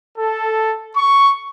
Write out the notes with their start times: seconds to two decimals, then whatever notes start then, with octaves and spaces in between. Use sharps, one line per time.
0.18 A4
0.96 C#6